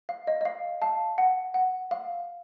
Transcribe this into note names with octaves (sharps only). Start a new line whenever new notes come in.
F5
D#5
D#5
F5
F5 A5
F#5
F#5
F5